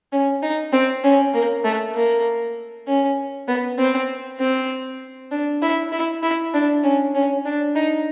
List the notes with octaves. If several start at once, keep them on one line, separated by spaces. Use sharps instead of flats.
C#4
D#4
C4
C#4
A#3
A3
A#3
C#4
B3
C4
C4
D4
E4
E4
E4
D4
C#4
C#4
D4
D#4